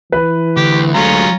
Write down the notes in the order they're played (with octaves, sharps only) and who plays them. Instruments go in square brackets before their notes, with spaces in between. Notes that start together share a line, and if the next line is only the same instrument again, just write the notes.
[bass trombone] E3 [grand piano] B4
[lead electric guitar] D2 [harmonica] G4
[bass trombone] D2 [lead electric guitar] F#3 G#3 [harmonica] C#4 F4 A#5